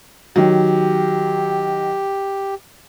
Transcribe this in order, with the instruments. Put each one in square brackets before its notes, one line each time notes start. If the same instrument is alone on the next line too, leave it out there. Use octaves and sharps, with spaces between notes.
[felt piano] D#3 F#3 [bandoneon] G4